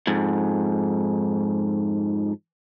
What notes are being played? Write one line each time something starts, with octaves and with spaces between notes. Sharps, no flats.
F2 G#2